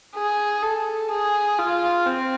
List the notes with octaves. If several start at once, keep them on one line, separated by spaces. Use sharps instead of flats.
G#4
A4
G#4
F4
C4